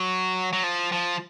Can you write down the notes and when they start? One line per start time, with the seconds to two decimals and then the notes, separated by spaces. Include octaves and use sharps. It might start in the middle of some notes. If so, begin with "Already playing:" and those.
Already playing: F#3
0.53 F#3
0.64 F3
0.92 F3